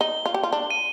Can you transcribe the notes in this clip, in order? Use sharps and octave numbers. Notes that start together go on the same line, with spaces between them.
D#4 G7
F4
G4
F4
D4
D#7